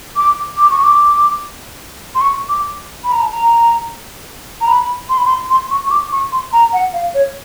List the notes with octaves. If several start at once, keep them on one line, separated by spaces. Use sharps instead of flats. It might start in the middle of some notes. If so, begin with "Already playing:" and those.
D6
D6
C#6
D6
C6
C#6
D6
B5
A#5
A5
A#5
A#5
B5
C6
B5
C6
C6
C#6
C#6
D6
C#6
C6
A#5
F#5
F5
C#5